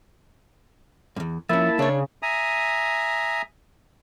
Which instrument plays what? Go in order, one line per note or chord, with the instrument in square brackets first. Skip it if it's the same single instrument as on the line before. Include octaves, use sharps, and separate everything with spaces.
[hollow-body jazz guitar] E2 G2
[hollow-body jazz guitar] F3 C#4 [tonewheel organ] A#3 E5 A5 [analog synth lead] E4
[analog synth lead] C#3 [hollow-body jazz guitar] D4 C#5
[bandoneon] E5 G#5 A#5 D#6